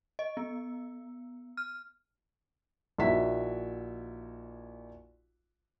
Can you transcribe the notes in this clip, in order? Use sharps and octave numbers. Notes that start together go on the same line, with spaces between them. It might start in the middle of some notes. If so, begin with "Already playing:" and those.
D#5
B3
F6
A#1 D#4 E4 F#4 E5 B6